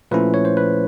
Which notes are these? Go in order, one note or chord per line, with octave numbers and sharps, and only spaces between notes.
A#2 F3 A3 C#4 E4 B4
C#5
C5
B4